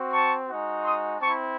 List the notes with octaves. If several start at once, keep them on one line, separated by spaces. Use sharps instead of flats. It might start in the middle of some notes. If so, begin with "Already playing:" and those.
Already playing: C4 F#4
A5 C#6
G#3 D#4 F#4
C6 D#6
C4 E4 A5 C#6